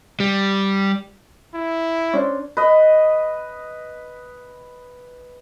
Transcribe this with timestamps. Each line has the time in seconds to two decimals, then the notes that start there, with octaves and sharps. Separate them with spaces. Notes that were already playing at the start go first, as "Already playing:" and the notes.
0.20 G3
1.55 E4
2.13 C#4 D4 C5
2.57 B4 D#5